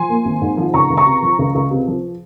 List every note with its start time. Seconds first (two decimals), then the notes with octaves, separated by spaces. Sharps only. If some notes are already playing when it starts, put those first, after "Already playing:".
Already playing: F3 G#5 C6
0.09 A#3
0.25 G#1
0.41 G#2
0.57 F3
0.74 C#2 A#5 C#6
0.90 C#2
0.97 A#5 C#6
1.05 C3
1.22 F3
1.39 C#2
1.55 C#2
1.71 C3
1.87 F3